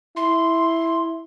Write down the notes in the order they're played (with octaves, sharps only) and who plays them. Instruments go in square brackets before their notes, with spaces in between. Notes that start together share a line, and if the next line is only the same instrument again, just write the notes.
[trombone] E4 [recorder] C6